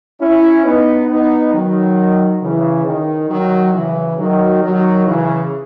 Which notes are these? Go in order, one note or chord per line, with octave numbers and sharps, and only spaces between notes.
C#4 E4
B3 D#4
B3 D#4
D#3 F#3
C#3 E3
D#3
D#3 F#3
C#3 E3
D#3 F#3
D#3 F#3
C#3 E3